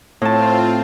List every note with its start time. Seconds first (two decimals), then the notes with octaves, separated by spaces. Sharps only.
0.22 A2 C4 F4 A5